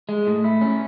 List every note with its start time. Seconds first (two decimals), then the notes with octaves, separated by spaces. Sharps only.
0.09 G#3
0.27 A2
0.44 E4
0.61 C#4